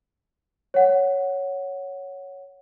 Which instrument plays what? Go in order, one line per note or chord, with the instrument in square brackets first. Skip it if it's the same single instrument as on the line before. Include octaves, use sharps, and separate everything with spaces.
[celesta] C#5 F#5